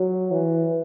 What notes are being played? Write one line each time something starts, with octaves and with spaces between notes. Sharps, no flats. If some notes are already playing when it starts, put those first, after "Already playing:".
Already playing: F#3
E3